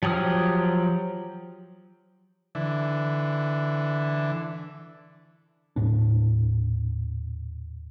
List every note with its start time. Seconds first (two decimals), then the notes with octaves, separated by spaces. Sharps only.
0.03 F3 F#3 G4 D#6 F6
2.55 D3 E3
5.76 D#1 A2 D4